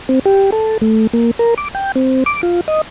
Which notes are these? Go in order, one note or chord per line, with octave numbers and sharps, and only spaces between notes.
C4
G4
A4
A3
A#3
A#4
D6
G5
C4
D6
F4
D#5